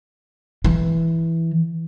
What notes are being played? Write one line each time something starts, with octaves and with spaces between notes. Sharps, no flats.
E3